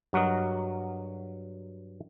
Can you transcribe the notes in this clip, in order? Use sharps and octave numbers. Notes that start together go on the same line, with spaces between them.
G2 F#3 F#4 A#4 D#5